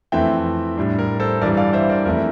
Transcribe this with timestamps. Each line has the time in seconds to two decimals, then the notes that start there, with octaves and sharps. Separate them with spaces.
0.12 F2 E3 A3 C4 E5 G5
0.77 A2 G3 D4
0.99 A#4
1.20 A4 C5
1.41 G2 E3 G3 A#4 D5
1.57 D5 F5
1.73 C5 E5
1.90 A#4 D5
2.05 F2 E3 A3 C4 E4 A#4